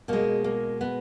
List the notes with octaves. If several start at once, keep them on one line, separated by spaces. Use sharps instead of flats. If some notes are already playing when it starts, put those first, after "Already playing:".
B2 G#3 A#3
A#3
B3